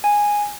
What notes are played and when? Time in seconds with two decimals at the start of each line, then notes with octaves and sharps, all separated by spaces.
0.04 G#5